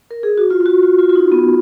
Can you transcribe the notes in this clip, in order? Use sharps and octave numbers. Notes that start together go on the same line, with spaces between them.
A#4
G#4
F#4
F4
F4
F#4
F4
F4
F4
D#4
B3